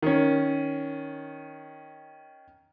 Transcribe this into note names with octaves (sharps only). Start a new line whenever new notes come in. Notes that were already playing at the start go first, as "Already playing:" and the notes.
D#3 C#4